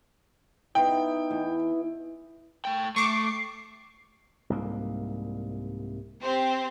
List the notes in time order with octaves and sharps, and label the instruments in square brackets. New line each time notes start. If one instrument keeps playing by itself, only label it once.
[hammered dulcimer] B3 E4 [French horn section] D#4 [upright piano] G5
[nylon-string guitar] E2
[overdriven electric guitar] A3 G5
[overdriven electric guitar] A3 [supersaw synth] C#6 D6 [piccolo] C7
[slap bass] C2 G#2 A#3
[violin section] C4 G4 C5